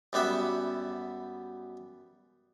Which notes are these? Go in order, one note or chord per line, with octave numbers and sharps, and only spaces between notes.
F#2 G3 B3 E5